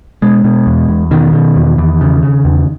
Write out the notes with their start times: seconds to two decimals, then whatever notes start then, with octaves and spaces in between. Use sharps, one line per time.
0.22 B2 G#3
0.44 B2
0.67 E2
0.89 E2
1.11 B2 D#3
1.33 B2
1.56 E2
1.78 E2
2.01 C#3
2.23 C#3
2.45 E2